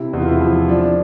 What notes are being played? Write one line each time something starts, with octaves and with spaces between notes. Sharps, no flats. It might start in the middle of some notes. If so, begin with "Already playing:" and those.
Already playing: C3 E4
E2
F4
E4
F3
F3 D4